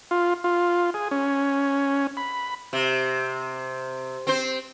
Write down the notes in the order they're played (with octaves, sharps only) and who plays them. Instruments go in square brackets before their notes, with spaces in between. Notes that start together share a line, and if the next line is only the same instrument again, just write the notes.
[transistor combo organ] F4
F4
G#4
C#4
B5
[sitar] C3
C4 C5